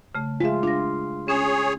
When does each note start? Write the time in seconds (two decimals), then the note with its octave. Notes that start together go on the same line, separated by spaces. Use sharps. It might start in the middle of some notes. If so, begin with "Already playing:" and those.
0.15 C#3 A3
0.40 G#3 F4 G#4 E5
0.63 D4 F4 A#6
1.28 C#4 G#4 C#5